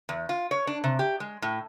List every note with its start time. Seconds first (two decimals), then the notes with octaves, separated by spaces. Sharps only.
0.09 E2
0.29 F4
0.51 C#5
0.67 D4
0.84 C3
0.99 G4
1.20 G#3
1.42 A2